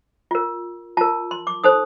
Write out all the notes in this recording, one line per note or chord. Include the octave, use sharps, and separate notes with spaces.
F4 A#4
F4 A#4 A5
C6
D6
D#4 A4 C5 D#6